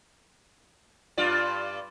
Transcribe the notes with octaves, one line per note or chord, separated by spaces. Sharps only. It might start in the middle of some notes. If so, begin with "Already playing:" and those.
G2 F4 D5